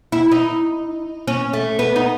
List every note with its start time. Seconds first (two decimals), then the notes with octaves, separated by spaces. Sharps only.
0.12 E4
0.31 D#4
1.27 C#4
1.53 A3
1.79 B3
1.96 D#4